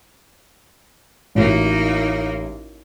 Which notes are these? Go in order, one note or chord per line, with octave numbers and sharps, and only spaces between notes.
A1 A#3 D#4 E4 F#4